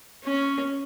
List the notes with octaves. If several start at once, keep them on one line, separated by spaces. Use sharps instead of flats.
C#4